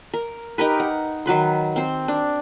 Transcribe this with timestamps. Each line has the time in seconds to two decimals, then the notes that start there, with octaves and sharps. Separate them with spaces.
0.14 A#4
0.58 D#4 G4 A#4 B4
0.80 F#5
1.26 D#3 F#3 B4 C6
1.76 C4 C5
2.08 D4